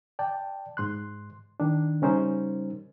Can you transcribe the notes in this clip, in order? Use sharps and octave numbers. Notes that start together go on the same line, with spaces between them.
D5 G5 A5
G#2 C6 F#6
D#3 D4
C#3 G3 C#4 D#4 A#4 C5